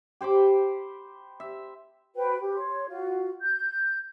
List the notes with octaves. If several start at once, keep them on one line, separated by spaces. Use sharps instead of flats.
G4 C5 B5 D6
E5
F#4 B4 C5 G5
G4
C#5 C6
F4 F#4
G6